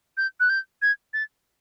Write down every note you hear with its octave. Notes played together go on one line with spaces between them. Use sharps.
G6
F#6
G6
G#6
A6